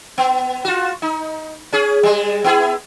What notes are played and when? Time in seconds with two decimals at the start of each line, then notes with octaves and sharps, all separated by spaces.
0.18 B3
0.65 F4 F#4
1.02 D#4
1.73 C#4 G#4
2.03 G3 G#3
2.44 B3 E4 G#4